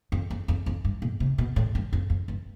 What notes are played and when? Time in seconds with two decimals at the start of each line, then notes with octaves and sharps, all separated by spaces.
0.12 F2
0.30 F2
0.48 F2
0.66 F2
0.85 G2
1.02 B2
1.20 C3
1.38 B2
1.56 A2
1.75 G2
1.93 F2
2.10 F2
2.28 G2